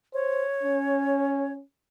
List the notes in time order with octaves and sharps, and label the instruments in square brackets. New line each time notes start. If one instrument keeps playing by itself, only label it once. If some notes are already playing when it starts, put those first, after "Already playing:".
[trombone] C5 [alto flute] C#5
[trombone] C#4